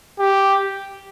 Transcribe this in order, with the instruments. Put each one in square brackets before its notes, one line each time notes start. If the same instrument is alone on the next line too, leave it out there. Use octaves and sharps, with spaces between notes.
[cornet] G4